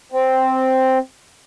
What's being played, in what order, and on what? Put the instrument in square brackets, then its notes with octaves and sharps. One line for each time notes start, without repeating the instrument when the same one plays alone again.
[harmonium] C4